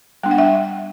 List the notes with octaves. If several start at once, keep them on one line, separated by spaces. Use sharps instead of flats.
G3 B3 D4 G5
F#5
E5 G5